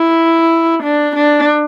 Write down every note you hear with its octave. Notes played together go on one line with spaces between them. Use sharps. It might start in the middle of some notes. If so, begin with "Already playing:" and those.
Already playing: E4
D4
D4